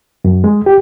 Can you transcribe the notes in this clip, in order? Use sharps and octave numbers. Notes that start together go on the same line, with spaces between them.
F#2
G#3
G4